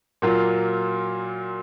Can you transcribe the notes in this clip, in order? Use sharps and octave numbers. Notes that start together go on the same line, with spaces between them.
A#2 F#3 A#3 F4